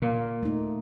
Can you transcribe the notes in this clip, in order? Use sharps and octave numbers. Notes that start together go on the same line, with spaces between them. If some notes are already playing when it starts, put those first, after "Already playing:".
A#2 A#3
A3 D#4